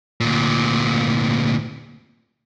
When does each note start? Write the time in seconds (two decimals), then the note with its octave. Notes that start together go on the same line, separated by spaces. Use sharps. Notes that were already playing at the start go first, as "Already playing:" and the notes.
0.20 D2 A#2